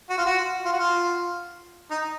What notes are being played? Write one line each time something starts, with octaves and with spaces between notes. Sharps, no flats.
F#4
F4
F#4
F4
F#4
F4
D#4